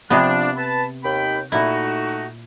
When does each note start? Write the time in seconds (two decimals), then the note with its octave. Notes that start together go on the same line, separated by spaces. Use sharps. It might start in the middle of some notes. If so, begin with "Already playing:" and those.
0.10 C3 F3 B3 D4
0.56 B4 A5
1.03 D#2 G5 B5
1.52 A#2 A3 D#4 E4 F#4